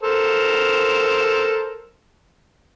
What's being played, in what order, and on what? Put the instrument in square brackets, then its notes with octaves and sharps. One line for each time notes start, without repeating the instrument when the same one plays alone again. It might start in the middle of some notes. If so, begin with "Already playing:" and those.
[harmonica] A4 A#4 C5